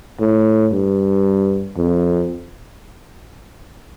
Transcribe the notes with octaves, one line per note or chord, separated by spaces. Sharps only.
A2
G2
F2